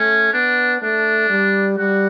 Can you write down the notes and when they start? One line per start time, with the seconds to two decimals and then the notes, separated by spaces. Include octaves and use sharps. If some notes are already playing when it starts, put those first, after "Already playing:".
Already playing: A3 C#4
0.33 B3 D4
0.82 A3 D4
1.30 G3
1.78 G3 F#4